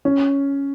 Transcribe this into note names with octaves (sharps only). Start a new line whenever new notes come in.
C#4